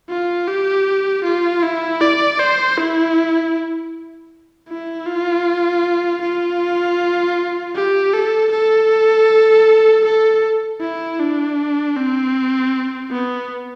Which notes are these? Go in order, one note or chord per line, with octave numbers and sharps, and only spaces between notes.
F4
G4
F4
E4
D5
C5
E4
E4
F4
F4
G4
A4
A4
A4
E4
D4
C4
B3